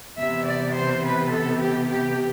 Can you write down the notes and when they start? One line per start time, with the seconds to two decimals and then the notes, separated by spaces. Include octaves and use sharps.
0.19 C3 E3 B3 E5
0.48 D5
0.76 C5
1.05 B4
1.33 A4
1.61 G4
1.90 G4